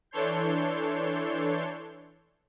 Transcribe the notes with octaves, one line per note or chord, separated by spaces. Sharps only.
E3 D4 A4 C#5 C6 G6